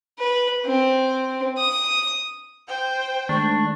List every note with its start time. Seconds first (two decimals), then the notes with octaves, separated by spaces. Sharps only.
0.19 B4
0.65 C4
1.58 D#6
2.68 C5 G5
3.29 D#3 G#3 A3 D4 C#6